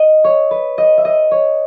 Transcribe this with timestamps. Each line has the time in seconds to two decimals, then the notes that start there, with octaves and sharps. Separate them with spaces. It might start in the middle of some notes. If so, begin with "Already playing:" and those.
Already playing: D#5
0.24 C#5
0.51 B4
0.78 D#5
0.98 E5
1.05 D#5
1.31 C#5